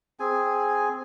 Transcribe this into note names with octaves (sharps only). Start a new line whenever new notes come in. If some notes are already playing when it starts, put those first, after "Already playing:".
C4 G#4 G#5